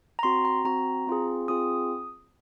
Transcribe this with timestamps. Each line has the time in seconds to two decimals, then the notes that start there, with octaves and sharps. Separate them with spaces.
0.19 A#5
0.23 C4 F#4 C6
0.45 A#5
0.65 C4 F#4 A#5
1.07 C4 F4 G#4
1.48 C4 F4 G#4 D#6